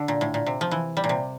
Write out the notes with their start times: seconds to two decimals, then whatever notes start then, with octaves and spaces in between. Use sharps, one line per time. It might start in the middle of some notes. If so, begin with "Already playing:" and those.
Already playing: D3
0.08 A#2
0.21 A2
0.34 A#2
0.46 C3
0.61 F3
0.71 E3
0.97 G3
1.04 A#2
1.09 C3